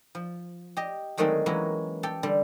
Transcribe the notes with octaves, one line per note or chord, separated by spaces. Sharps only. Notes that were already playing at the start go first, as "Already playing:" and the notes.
F3
G4 D#5
D3 D#3 F#3 G#3 A3 C4
E3 F#3 G#3 A#3 C#4
G4 A4 G5
D3 G3